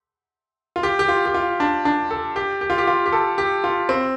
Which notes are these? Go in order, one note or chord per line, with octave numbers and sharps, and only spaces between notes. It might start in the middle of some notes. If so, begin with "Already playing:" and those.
F4
G4
G4
F4
G4
F4
D4
D4
A4
G4
G4
F4
G4
F4
G4
A4
G4
F4
C4